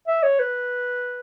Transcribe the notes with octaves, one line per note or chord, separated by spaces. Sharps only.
E5
C#5
B4